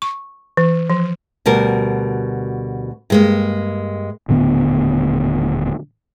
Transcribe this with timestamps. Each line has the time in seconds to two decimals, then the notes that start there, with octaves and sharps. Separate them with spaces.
0.02 C#6
0.57 E3
0.90 F3
1.46 D2 B2 G3 A#4
3.10 G2 G#3 A#3
4.29 D#1 A2 D3 B3